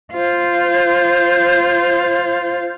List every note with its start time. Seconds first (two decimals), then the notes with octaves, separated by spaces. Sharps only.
0.14 F4 C5